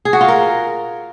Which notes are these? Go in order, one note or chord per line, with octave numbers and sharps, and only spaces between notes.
G#4
F#4
F4
A#4